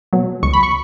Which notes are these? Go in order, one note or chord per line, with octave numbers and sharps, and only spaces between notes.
B2 F#3
C#2 C#6
B5
C#6